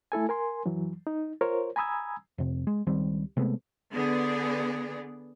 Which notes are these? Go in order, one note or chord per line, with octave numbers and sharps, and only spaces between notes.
A3 E4 A4 G#5
A#4 G#5 C6
F#2 E3 F#3
D#4
F4 A#4 C5 C#5
G#5 A#5 B5 D#6 E6 G#6
F2 C3
G#3
C#2 D#3 G3 C4
C3 G#3 A3 B3
D3 B3 G#4 D5